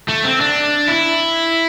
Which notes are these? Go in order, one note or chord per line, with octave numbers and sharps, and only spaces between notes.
A3
C4
D4
E4